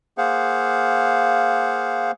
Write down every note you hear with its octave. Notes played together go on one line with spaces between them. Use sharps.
A#3 G#4 C5 F5 F#5